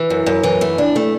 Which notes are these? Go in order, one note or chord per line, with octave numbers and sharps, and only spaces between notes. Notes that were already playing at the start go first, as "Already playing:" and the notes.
Already playing: E3
F#2
F#2
E3
A3
D4
A3